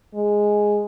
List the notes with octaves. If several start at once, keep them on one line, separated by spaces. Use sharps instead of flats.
G#3